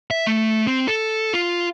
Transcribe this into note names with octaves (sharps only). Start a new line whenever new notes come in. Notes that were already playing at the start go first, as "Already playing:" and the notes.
E5
A3
C4
A4
F4